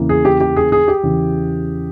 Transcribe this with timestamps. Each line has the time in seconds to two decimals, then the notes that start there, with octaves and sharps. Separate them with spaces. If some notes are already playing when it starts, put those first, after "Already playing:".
Already playing: E2 C#3 E3 A#3
0.09 G#4
0.25 G4
0.41 G4
0.56 G#4
0.72 G#4
0.88 G4
1.03 E2 C#3 E3